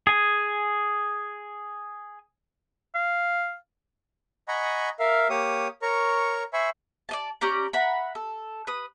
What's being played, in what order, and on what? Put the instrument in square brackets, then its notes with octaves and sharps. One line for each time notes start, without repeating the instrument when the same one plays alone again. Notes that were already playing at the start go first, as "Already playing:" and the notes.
[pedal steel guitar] G#4 G#5
[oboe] F5
[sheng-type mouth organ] D#5 F#5 G#5 A#5 B5 C#6
A#4 E5 F5
A#3 G4 C#5 D#6
A#4 C#5 A#5 C#6
C5 E5 G#5 B5 C#6
[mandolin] D5 D#5 A5
C#4 G4 D5 A#5
E5 F#5 A#5 B5
A4
B4 D#6